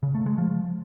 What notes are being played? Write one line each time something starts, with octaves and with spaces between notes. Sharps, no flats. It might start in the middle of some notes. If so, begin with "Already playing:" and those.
C#3
A3
G#3
F3